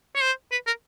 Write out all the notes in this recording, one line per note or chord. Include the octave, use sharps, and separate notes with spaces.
C#5
C5
B4
A#4